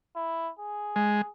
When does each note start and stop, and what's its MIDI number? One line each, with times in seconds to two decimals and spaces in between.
0.16 0.51 64
0.59 1.30 68
0.96 1.21 56